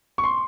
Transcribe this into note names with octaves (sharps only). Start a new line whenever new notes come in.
C#6
C6